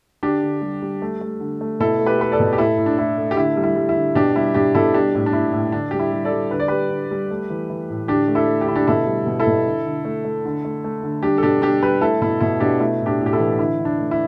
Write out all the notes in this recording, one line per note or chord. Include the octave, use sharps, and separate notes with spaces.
D3 D4 G4
D3
G3
G3
A3
A3
D3
A3
B2 E4 A4
A3
G4 B4
A3 B4
A4 D5
B2
G4
A2 E4 A4
A2
D4
A3 E4
A3
G4
D3 E4
G3
E4
G3
E4
D3
B2 D4 G4
G3 E4
B2 D4 G4
B2 E4 A4
G3 D4 G4
A2
D4
A2 E4
A2
D3 D4
G3 G4
E4
G3
A4 D5
G3
D3 B4
D5
G3 G4 B4
D3
G3
A3
E3
E3
A2
D3 D4 G4
A3
E4 A4
A3
G4
D3 E4
D4 G4
B2 E4 A4
G3
B2
E4 A4
B2
D3
D3
A3
A3
D3
A3
A3
D3
G3 D4 G4
A4
B2 D4 G4
G3 D4 G4
G3 G4 B4
A3 E4 A4
B2 E4
B2 E4
B2 D4 G4
A3 E4
A2
D4 G4
A2
G4
E4 A4
E3
D3 E4
D3
D4
A3
E4